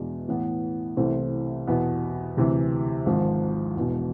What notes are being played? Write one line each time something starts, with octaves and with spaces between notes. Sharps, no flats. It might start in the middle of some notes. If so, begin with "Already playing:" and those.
Already playing: E2 B2 G#3 D4
A2 E3 B3
C2 C3 E3 A3 C4
E2 B2 B3
D2 C3 E3
G#1 G#2 F3
E1 E2 B2